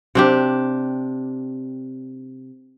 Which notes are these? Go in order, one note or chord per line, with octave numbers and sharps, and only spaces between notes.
C3 D4 G4